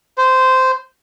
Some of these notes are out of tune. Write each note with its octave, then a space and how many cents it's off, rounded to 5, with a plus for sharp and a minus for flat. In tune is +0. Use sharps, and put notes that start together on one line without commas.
C5 -15